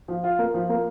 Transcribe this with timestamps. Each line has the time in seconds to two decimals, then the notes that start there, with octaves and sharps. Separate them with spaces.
0.08 F3
0.24 F4
0.39 A#3
0.54 F3
0.69 A#3